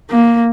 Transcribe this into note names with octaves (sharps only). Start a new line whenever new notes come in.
A#3